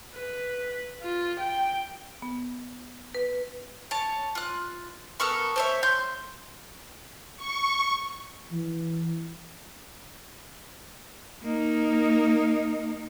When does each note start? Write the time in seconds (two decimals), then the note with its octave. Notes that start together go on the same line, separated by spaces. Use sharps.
0.15 B4
1.02 F4
1.39 G5
2.22 B3
3.14 B4
3.91 C#5 A5
4.35 F4 F#6
5.20 B3 A4 A#4 C#6
5.56 C5 C#5 E5
5.83 C6 G6
7.37 C#6
8.52 E3
11.43 A#3 D#4